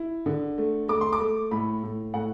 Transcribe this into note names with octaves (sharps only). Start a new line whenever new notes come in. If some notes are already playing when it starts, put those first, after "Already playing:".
Already playing: E4
D3
A3
A3 D6
C6
D6
A3
A2 B5
A2
A2 F#5